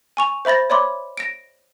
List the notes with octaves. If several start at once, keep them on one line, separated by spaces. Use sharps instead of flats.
G#5 C#6 F7
C5 E5 B5 A6 A#6
C#5 D5 E5 B5 C6 D6
A#6 D7